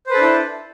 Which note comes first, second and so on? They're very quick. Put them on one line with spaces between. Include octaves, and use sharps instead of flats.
C5 B4 A4 D4 E4